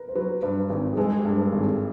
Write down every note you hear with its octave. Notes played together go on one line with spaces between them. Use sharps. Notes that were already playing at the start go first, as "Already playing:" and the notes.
Already playing: A#4 B4
C5
F#3 B4
G2 B4
G#1
G#4
G#3 A4
G4
G2
A#4
A4
G#1 G4
G#4